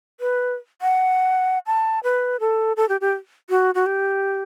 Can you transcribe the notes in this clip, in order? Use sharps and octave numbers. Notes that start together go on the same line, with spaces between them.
B4
F#5
A5
B4
A4
A4
G4
G4
F#4
F#4
G4